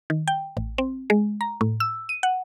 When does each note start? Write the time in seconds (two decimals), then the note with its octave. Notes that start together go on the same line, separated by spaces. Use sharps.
0.10 D#3
0.28 G5
0.57 A1
0.78 C4
1.10 G#3
1.41 A#5
1.61 A2
1.80 E6
2.09 D#7
2.23 F#5